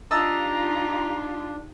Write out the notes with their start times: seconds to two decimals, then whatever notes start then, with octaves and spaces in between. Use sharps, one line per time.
0.11 D4 D#4 F4 G4 D#5 A5 A#5 E6